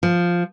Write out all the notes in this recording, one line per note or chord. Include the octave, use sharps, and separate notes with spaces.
F3